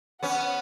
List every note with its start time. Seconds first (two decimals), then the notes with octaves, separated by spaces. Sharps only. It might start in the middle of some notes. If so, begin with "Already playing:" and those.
0.23 B3 C#4 F#5